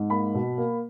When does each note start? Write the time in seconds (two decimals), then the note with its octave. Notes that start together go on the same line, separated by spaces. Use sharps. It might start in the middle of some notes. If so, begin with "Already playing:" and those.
Already playing: G#2
0.10 A#3 B5
0.34 B2
0.57 A#3